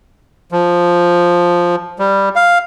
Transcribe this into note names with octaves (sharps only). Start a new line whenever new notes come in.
F3
G3
F5